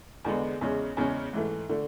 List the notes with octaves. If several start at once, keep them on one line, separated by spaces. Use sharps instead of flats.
E2 D3 G#3 B3
E2 C#3 G#3 C#4
E2 C#3 G#3 C#4
G#2 E3 A3
D3 A3